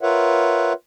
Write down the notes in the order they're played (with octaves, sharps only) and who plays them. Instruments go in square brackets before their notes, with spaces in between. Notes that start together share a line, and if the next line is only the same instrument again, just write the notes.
[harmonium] F4 A#4 B4 C#5 E5 F#5